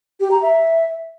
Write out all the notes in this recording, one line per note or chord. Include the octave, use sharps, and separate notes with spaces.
G4
A#5
E5